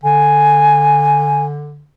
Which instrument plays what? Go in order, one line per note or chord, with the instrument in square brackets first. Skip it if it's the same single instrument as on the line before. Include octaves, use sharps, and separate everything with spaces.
[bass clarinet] D3 [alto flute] G#5